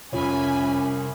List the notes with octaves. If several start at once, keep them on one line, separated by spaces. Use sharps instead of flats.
C2 F2 C#4 F4 C#5 G#5 B5